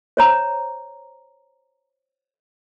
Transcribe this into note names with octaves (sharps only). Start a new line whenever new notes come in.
C5 C#5 A#5